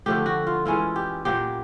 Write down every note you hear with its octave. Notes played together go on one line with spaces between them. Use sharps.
D3 F3 A3 G4
F#4
F4
E3 G#3 C#4 E4 F4
G4
A#2 F#3 A#3 G4